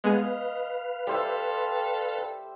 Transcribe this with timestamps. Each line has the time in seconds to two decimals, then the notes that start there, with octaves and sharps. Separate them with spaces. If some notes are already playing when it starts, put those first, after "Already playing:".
0.04 G#3 B3 G#4 B4 D#5 F5
1.07 G3 A4 C5 E5